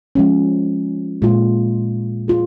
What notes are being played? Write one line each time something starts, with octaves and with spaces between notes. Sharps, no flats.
F3 G#3 C#4
A#2 G#3 F4
F4 G#4